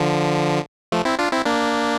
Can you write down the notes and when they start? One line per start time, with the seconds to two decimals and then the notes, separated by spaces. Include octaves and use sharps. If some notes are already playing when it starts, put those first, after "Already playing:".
Already playing: D3 F3
0.92 F3 A3
1.05 C4 E4
1.19 D4 F4
1.32 C4 E4
1.45 A#3 D4